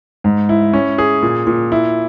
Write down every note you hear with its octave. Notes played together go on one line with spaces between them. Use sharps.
G#2
E4
C#4
G#4
A#2
A#2
E4